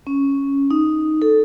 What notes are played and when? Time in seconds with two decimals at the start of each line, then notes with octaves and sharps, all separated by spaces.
0.07 C#4
0.71 D#4
1.22 A4